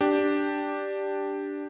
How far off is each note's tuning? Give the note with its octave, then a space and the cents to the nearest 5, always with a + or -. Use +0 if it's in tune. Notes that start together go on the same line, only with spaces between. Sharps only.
D4 +0 G4 +0